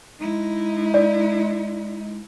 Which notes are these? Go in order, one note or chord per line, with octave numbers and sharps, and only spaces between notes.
G#3 D#4 E4
D5